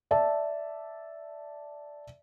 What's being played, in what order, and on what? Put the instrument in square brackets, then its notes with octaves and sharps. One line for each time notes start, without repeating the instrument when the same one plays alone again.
[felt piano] D5 E5 A5